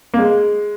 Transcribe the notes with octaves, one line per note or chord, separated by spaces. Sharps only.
A#3
G#3